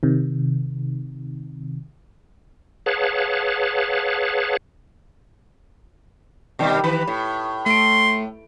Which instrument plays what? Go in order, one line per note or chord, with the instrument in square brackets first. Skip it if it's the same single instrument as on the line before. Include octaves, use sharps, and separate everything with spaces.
[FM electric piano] C3 D#3
[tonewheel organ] G#4 B4 C#5 F5 F#5 A5
[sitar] B2 D#3 G3
[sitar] D#3 B4 [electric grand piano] B5
[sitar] A2
[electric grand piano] A3 D7 [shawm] C6